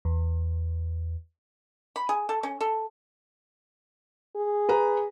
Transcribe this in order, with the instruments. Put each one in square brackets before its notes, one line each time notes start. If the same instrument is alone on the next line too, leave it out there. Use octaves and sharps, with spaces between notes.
[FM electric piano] E2
[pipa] B5
G#4
A4
C#4
A4
[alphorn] G#4
[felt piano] B4 A#5